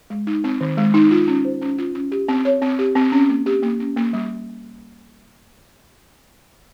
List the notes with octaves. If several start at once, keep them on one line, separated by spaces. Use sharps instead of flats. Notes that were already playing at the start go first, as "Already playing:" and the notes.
G#3
D#4
C4
D#3
G#3
D#4
F4
C#4
C5
C#4
F4
C#4
G4
C4
C#5
C4
G4
C4
C#4
A#3
G4
A#3
C#4
A#3
G3